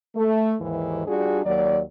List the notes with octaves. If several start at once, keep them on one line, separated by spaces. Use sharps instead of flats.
A3
D#2 G#2 E3
G3 D4 F4 F#4 G#4
D#2 F#3 D5